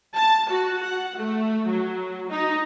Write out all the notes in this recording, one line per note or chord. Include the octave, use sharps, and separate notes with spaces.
A5
F#4
F#5
A3
F#3
D#4